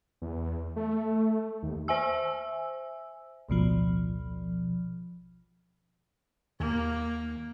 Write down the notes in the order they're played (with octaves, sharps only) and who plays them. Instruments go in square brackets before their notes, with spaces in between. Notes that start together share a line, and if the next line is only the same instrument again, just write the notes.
[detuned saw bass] E2
A3
D#2
[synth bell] C5 E5 G#5 E6
[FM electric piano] A1 D2 B2 F3
[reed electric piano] D#2 [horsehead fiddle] A#3